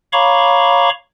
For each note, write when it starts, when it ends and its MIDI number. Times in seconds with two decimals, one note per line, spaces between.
0.13 0.89 73
0.13 0.89 77
0.13 0.89 82
0.13 0.89 83
0.13 0.89 85
0.13 0.89 86